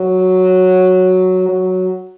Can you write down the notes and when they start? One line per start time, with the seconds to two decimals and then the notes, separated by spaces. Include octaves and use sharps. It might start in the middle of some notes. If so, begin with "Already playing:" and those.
Already playing: F#3
1.49 F#3